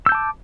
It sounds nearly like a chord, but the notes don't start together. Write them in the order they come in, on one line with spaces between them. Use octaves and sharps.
E6 G6 A5 D6